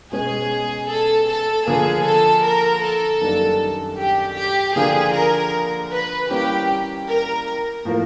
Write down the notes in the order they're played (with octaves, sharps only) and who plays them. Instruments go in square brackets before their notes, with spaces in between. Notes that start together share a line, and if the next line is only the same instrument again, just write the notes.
[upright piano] B2 G#3 C#4 [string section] G#4
[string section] A4
A4
[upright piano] D3 F3 A#3 [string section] G#4
[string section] A4
A#4
A4
[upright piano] F#2 D#3 G3 A#3 D4
[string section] G4
G4
[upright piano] D3 F3 A#3 D4 F4 [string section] G#4
[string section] A#4
B4
[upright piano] E3 G3 A#3 C#4 [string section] G4
[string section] A#4
[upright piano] A2 F3 A#3